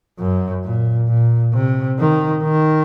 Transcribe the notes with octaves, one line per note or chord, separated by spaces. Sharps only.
F#2
A#2
A#2
C3
D#3
D#3